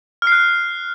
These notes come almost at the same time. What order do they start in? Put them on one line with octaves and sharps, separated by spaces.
F6 C7 F#6